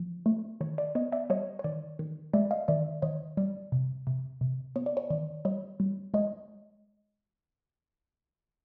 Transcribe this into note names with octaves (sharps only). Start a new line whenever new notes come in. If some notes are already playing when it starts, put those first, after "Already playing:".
Already playing: F3
A3
D#3 C#5
D5
B3 C#5 D#5
D5 E5
G3 C#5 D#5
C#5
D#3 D5
D#3
G#3 D5 E5
D#5 F5
D#3 D5 E5
D#3 C#5 D#5
G3 D5
C3
C3
C3
B3 C#5
D5
C#5
D#3 D5
G3 C#5 D#5
G3
G#3 C#5 D#5